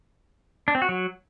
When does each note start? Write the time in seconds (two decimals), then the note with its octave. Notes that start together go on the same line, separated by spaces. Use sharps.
0.68 D4
0.75 C4
0.82 F#4
0.89 F#3